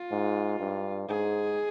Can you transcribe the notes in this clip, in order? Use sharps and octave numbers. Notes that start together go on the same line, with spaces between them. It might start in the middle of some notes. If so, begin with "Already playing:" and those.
Already playing: F4
G#2
G2
G#2 G#4